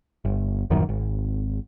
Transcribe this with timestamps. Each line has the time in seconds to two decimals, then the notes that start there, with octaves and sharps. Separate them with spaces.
0.25 G1
0.70 D#1 A1 F#2 D#3
0.89 G#1